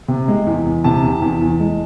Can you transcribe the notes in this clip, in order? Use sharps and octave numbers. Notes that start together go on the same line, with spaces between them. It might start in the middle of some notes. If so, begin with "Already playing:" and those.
C3
G#3
E2
E2
C3 A5
E2
E2
E2
G#3